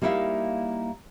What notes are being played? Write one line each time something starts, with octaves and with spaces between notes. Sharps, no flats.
G3 A#3 D#4 E4 E5 F5